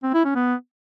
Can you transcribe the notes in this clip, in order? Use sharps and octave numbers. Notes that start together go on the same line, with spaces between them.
C4
E4
C#4
B3